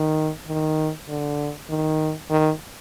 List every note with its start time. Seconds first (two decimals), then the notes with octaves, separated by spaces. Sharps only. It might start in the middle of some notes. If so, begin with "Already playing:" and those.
Already playing: D#3
0.48 D#3
1.08 D3
1.70 D#3
2.30 D#3